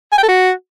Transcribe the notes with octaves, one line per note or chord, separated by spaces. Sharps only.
G#5
G5
A4
F#4